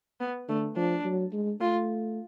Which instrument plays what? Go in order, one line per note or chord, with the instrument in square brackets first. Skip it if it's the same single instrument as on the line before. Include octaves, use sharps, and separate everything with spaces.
[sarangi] B3
[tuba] D3 [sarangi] A3
[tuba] F3 [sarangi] D4
[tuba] F#3
G#3
[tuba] A3 [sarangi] F4